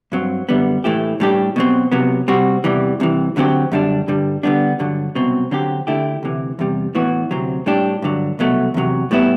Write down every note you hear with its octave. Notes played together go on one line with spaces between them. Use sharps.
G2 F#3 C4
F#2 D3 G3 B3
A2 E3 A3 E4 G4
A2 G3 D4 G4
B2 F#3 C4
C3 F#3 B3
C3 G3 C4 F#4
E2 C3 E3 G3
C2 C3 E3
D2 D3 F#3 C4 G4
F#2 D3 G3 D4
G2 D3 G3
D3 G3 B3 D4
G2 D3 F#3
C2 B2 F#3 C4
D3 F#3 C4 G4
D3 A3 E4 G4
D2 C3 E3
E2 C3 G3
A2 E3 B3 F#4
D2 C3 F#3 C4
A2 G3 D4 G4
G2 D3 F#3
C2 B2 F#3 A3
E2 C3 F#3
A2 G3 B3 E4